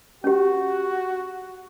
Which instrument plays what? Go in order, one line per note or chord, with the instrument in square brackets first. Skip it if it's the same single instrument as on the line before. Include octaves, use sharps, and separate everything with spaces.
[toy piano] C#4 G4 [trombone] F#4